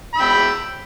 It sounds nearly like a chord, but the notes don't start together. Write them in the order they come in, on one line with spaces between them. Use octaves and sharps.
B5 E6 G5